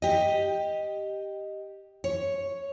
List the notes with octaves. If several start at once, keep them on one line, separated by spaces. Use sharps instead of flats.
G4 D#5
C#5